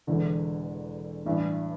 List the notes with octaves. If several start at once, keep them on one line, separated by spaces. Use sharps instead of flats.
E1 E2 D3
A1 G2 E3